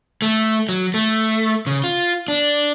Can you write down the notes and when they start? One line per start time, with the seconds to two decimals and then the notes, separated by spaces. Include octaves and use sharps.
0.22 A3
0.69 F#3
0.94 A3
1.67 C#3
1.84 F4
2.28 D4